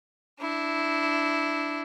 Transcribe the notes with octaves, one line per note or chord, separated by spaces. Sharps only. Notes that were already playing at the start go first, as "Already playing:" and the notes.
D4 E4